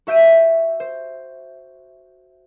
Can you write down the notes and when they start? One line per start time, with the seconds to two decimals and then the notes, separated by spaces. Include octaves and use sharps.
0.07 F#4 E5 G6 D7 D#7
0.80 C5